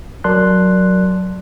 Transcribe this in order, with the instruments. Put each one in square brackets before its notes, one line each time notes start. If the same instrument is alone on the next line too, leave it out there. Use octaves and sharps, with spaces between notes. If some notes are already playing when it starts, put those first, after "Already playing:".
[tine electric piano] F#3 A#4 D5 A5 C6 F#6